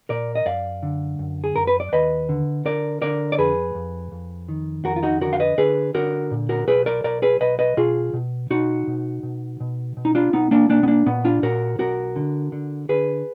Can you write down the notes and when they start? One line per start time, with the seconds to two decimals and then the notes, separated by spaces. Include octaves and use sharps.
0.09 A#2 A#4 D5
0.35 D#5
0.45 F#2 D5 F5
0.83 D3
1.19 F#2
1.44 G#4
1.56 F#2 A#4
1.67 B4
1.80 D5
1.92 D#2 B4 D#5
2.29 D3
2.65 D3 A#4 D5
3.02 D3 A#4 D5
3.32 D5
3.38 F2 G#4 B4
3.75 F2
4.12 F2
4.49 D#3
4.85 F2 F#4 A#4
4.96 F4
5.03 D#4 F#4
5.21 D3 F#4 A#4
5.33 F5
5.40 B4 D#5
5.58 D3 G#4 B4
5.94 D3 F#4 A#4
6.31 A#2
6.49 F#4 A#4
6.68 B1 G#4 B4
6.86 A#4 D5
7.04 B1 A#4 D5
7.22 G#4 B4
7.40 B1 B4 D#5
7.59 B4 D#5
7.77 B2 F4 G#4
8.13 B2
8.50 B2 D#4 F#4
8.87 B2
9.23 B2
9.60 B2
9.97 B2
10.05 D#4
10.15 D4 F4
10.33 B1 B3 D#4
10.51 A#3 D4
10.70 B1 A#3 D4
10.83 B3
10.88 A#3 D4
11.06 A#2 B3
11.24 D4 F4
11.43 A#2 F#4 A#4
11.79 B1 F#4 A#4
12.16 D3
12.52 D3
12.89 D3 G#4 B4